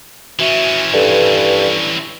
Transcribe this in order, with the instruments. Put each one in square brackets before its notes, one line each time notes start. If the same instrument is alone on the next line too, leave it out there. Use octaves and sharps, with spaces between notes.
[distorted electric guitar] E3 C#4 [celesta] F#4 E5
[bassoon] G2 [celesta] A4 B4